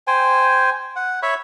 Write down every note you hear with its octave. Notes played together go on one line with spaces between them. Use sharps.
C5 G5 G#5
F#5
C#5 E5 B5 C#6